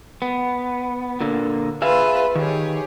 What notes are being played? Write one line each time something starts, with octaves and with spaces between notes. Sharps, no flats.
B3
A#2 D3 A#3
F4 G#4 B4 E5 F5
D#3 G4 G#4 C#5